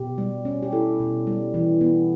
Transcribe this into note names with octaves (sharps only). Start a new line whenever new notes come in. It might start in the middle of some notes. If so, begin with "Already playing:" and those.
Already playing: B2 G4
G3
C#4
G4
E4 A4
B2
G3
E3
B3